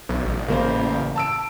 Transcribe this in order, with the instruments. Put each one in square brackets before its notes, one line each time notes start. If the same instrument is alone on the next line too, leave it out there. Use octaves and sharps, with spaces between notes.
[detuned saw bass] B1
A1
[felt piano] C#3 A#3 C5
A5 E6 D7